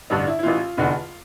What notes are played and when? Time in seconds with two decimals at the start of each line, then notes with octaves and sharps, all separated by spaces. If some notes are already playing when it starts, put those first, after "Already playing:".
0.10 A1 G2 D3 D4
0.27 E4
0.39 E4
0.43 A1 A2 E3 F4
0.77 F1 E2 D3